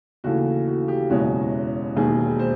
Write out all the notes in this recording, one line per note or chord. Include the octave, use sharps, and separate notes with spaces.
D#2 C#3 E3 A3 F#4
F#4
G4
F#1 E2 B2 G#3 C#4 F#4
E1 D#2 D#3 G#4
C5